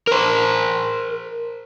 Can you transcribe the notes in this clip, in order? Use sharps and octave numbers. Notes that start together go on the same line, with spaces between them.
A#4 C5